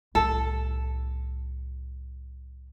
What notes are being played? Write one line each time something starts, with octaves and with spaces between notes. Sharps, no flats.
C2 A2 A4